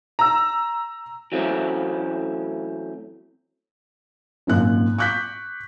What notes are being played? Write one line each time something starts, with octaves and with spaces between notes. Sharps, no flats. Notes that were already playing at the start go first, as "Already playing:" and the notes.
A#5 E6
E3 F#3 A3 C4 C#4
G#1 F#2 A#2 F#6
C#6 D6 F#6 G6 B6